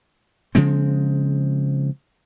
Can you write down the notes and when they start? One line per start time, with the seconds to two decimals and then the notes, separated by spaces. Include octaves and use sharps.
0.55 C#3 F3 G#3 C4